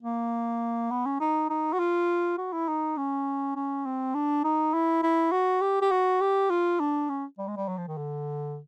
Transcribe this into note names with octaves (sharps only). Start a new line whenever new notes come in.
A#3
B3
C#4
D#4
D#4
F#4
F4
F#4
E4
D#4
C#4
C#4
C4
D4
D#4
E4
E4
F#4
G4
G4
F#4
G4
F4
D4
C#4
G3
G#3
G3
F#3
F3
D#3
D3